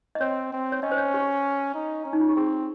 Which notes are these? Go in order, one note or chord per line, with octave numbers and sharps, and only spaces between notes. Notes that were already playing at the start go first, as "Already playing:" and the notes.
D#5
C4 C#5
C4
C#5
C#4 D#5
C5
C#5
G4
D#4
C#4
D#4
F4
G4
C4 G#4